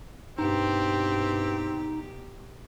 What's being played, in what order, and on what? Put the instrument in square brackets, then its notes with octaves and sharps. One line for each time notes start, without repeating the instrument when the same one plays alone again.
[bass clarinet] G2 [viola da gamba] B2 G4 [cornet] C4 [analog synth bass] D#4